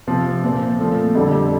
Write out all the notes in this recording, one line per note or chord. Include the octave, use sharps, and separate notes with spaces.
C3 F3 C4
A#2 F3 C4
A#2 F3 A3
F2 D3 G3